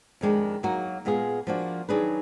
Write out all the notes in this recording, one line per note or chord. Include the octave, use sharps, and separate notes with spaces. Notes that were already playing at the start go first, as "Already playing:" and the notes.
F2 D#3 G#3 D4
F#3 A#3 D#4 F#4 A#4
A#2 G#3 B3 F4 G#4
F3 A#3 D4 F#4
D#3 F#3 D4 G#4 B4